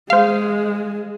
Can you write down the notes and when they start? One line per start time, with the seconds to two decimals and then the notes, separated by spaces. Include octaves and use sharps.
0.10 G#3 C5 F5